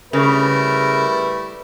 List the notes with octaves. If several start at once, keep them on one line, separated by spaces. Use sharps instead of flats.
C#3 G3 A3 E4 A#4 B4